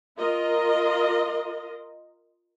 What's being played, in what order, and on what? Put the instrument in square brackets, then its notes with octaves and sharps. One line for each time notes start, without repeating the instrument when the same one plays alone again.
[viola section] F4 A#4 D#5